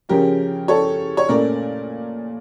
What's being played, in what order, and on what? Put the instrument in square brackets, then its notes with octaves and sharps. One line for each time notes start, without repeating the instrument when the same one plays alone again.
[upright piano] C#3 F3 C#4 [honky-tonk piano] G4 A#4
[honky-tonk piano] A4 C#5
C#5
[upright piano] A#2 A3 C#4 [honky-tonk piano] A#4 D5